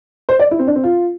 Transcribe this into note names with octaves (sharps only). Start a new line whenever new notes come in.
C5
D5
E4
C4
D4
C4
F4